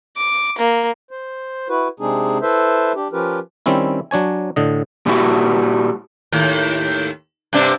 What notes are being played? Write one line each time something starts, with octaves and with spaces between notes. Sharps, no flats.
D6
A#3
C5
E4 F#4 B4
C3 G#3 C4 D4 D#4 G#4
E4 A4 B4 C5 E5
D4 G4
F3 C#4 F4 G4 A#4 B4
D#3 G3 C4 C#4 E4
F#3 D4 C#5 G#5
A2 D3 D#5
A#2 G3 E4 F#4
D#2 A2
G2 C3 D4